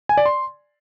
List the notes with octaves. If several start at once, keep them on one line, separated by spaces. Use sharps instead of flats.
G#5
D5
C6